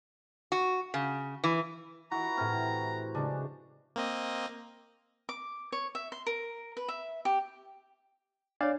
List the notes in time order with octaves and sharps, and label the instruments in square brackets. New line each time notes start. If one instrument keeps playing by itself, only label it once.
[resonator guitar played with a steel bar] F#4
C#3
E3
[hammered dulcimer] E3 F#4 [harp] E4 [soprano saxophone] A#5
[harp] A2 F6 [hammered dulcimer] C3
[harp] C#3 G#3 [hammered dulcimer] D4
[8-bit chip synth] A#3 C4 D#5
[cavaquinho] D6
C#5
E5
C6
A#4
B4
E5
G4
[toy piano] D4 C#5 [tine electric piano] D5 F5